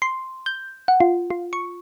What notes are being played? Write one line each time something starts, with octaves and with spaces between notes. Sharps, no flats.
C6
G6
F#5
F4
F4
C#6